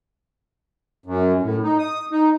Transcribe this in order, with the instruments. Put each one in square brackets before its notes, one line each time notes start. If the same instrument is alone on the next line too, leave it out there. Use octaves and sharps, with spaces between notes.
[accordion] F#2
A2
D#4
D#6
D#4